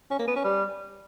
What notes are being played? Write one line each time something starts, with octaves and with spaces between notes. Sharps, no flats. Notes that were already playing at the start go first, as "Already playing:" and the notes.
C#4
A#3
B3
C#4
G3